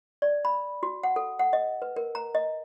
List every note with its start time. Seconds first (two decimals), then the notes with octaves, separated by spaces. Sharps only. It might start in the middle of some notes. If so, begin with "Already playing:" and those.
0.22 D5
0.45 B5
0.83 F#4
1.03 F#5
1.16 A4
1.39 F#5
1.53 D#5
1.82 B4
1.96 A#4
2.15 A#5
2.35 D#5